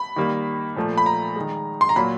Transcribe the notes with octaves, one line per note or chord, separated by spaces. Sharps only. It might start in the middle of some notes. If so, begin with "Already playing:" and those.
Already playing: B5
D#3 G3 A#3
A#2 F3 A3
B5
A#5
D#3 G#3
C6
A#5
A#2 F#3 A#3 B5